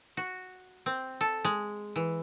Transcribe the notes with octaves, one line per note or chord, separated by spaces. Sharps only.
F#4
C4
A4
G#3
E3